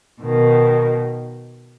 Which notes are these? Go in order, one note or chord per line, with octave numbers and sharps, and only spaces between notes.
B2 D#3